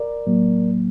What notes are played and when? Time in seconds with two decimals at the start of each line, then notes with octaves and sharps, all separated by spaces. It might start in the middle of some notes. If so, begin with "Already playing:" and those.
Already playing: A#4 D5
0.26 A2 F#3 A#3